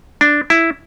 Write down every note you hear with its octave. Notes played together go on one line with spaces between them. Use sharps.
D4
E4